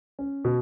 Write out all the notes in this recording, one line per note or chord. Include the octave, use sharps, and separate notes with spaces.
C#4
B2